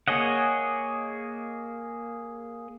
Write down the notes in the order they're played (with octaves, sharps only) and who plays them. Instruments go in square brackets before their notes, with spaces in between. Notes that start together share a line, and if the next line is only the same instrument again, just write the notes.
[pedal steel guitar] A#3 G#4 C#5 D#5 F#5